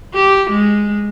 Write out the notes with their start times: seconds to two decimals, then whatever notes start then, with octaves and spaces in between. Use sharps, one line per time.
0.14 G4
0.50 G#3